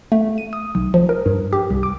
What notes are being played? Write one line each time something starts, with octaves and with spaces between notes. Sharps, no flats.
A3
D#7
D#6
B1
F3
A#4
G2
G4
C2
D6